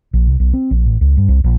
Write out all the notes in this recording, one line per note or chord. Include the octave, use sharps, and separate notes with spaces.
A#1
C2
B1
C4
A#1
A1
C#2
G2
C2
A#1